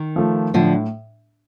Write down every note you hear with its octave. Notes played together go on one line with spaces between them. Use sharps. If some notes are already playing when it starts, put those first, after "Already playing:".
Already playing: D#3
F3 A3
A2 D3 F3